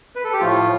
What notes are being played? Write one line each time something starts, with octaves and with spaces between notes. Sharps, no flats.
B4
A4
G4
A2 F3 A3 F4